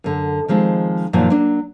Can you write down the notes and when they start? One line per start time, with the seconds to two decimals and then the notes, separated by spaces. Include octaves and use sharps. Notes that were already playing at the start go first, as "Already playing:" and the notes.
0.04 F#2 D3
0.48 D#3 F3 G#3 C4
1.13 F#2 A#2 D#3 F3 F#3
1.30 F#3 A#3 D4